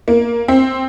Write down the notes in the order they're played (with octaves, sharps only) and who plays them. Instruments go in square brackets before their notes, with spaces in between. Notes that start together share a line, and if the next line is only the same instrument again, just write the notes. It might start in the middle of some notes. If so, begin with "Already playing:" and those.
[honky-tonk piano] A#3
C4